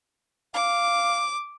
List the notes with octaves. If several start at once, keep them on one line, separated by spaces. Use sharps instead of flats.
F5 D6